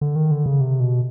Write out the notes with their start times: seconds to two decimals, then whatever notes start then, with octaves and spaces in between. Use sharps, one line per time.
0.01 D3
0.16 D#3
0.31 D3
0.46 C#3
0.61 C3
0.80 B2